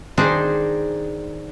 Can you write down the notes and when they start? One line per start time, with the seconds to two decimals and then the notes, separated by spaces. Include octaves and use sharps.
0.18 D#3 D4 D#4 G#4 C5